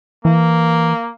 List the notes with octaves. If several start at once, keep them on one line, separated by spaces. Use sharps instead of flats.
E3 A#3